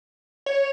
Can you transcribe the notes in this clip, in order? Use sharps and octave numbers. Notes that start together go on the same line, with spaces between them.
C#5